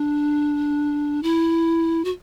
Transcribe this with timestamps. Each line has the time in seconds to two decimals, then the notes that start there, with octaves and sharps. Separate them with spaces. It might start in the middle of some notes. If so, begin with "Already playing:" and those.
Already playing: D4
1.23 E4
2.05 F#4